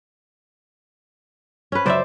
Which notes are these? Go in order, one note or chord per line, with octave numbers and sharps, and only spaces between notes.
C#4 B4
C#2 F#2 C5 D5 E5